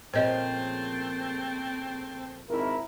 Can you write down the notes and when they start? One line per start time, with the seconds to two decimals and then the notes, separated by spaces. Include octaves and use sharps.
0.14 A#2 C#3 F3 A3 C4 C5 D#5
2.49 G#1 E4 A#4